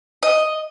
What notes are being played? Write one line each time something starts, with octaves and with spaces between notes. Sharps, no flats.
D#5